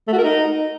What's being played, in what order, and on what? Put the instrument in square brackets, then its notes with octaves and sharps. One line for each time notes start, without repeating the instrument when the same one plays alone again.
[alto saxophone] A3
F#4
A#4
D#4